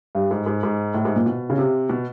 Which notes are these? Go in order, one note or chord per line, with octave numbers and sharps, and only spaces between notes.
G2
G#2
G#2
G#2
A2
G#2
A#2
B2
C#3
C3
B2